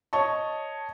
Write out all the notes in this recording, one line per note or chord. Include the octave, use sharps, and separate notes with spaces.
C#5 D#5 A5 C#6